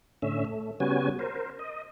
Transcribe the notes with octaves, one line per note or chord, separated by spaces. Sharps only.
A2 D3 C#4 E5
A3
C#3 G3 B3 C#4 F#4 G#5
A#4 C5
D#5